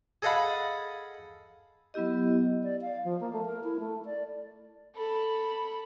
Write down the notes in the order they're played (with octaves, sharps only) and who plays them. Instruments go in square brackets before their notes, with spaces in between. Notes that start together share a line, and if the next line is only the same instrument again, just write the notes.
[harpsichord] G#4 A4 D#5 F5 F#5 B5
[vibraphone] F#3 B3 E4 G4 D#5
[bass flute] D5
F5
F3
A#3
A3
A#4
E4
A3
D5
[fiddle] A4 B5